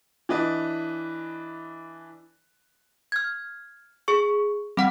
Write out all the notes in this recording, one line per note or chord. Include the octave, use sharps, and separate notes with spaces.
E3 D4 B4 D#5
F6 G#6
G#4 C#6
G3 C4 F#5